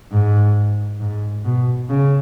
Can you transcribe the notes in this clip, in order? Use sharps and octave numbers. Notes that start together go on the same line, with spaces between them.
G#2
G#2
B2
C#3